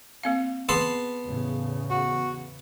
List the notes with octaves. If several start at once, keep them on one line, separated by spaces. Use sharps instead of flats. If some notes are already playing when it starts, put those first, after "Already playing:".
A#3 C4 F5
B3 G#4 A5 C6
E2 A2 C#3
F#4